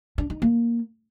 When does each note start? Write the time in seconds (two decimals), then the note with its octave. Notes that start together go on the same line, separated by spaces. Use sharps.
0.18 D4
0.30 D#4
0.42 A#3